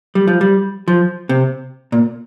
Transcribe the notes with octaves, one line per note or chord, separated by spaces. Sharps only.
G3
F3
G3
F3
C3
A#2